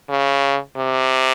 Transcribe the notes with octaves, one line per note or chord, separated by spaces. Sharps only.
C#3
C3